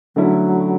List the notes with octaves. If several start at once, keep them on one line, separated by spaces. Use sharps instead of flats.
D3 F#3 A3 C#4 E4